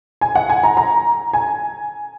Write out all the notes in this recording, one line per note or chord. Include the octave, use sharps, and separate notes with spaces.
G#5
F#5
G#5
A#5
A#5
G#5